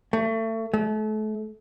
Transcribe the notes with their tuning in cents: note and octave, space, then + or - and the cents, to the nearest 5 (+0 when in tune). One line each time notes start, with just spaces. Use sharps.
A3 +30
A3 -35